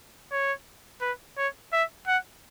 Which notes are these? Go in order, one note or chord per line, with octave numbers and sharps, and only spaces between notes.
C#5
B4
C#5
E5
F#5